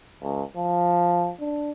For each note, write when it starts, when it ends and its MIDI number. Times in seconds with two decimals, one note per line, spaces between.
0.22 0.43 37
0.57 1.31 53
1.40 1.71 62